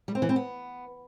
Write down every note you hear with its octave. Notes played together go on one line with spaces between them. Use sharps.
G3
C4
E3
C4
B3